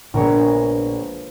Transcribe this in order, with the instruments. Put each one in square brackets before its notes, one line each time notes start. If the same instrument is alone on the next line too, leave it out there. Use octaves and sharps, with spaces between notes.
[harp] A#1 A#2 G#3 B3 A#4 C#5